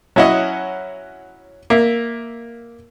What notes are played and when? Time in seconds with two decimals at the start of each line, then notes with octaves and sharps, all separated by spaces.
0.16 F#3 C#4 E4 F#4 D#5
1.70 A#3 E5